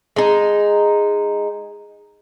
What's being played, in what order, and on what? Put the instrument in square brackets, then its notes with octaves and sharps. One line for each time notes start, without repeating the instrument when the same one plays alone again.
[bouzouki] G#3 D#4